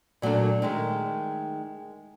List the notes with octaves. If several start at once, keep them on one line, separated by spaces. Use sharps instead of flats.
A#2 F#3 A3 A#3 D4
D#3 G#3 A3